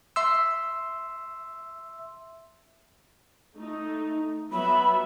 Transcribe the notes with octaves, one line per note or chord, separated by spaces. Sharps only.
E5 C6 E6
A3 D#4
F#3 B3 E5 B5